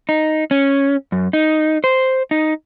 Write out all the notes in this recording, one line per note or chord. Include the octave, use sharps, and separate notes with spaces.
D#4
C#4
F#2
D#4
C5
D#4